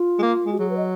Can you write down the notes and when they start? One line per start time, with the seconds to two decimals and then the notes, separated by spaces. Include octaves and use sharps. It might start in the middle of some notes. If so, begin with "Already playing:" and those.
Already playing: F4
0.19 G#3
0.22 A#3
0.46 G#3
0.52 F#4
0.58 F#3 G#4
0.70 B4
0.77 D#5